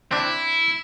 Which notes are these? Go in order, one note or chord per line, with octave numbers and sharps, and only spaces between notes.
C4 D4 E4